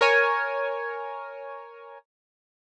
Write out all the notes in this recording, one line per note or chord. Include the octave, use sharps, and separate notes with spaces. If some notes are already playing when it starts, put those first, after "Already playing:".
A#4 C#5 G#5